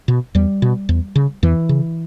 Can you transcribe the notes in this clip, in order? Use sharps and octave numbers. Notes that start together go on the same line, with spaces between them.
B2
E2 G3
B2
E2
C#3
E2 E3
C#3